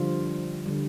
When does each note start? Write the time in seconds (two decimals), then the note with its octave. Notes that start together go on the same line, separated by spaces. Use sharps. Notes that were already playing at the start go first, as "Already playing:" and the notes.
Already playing: D3 F3 G3 F4
0.66 D3 G3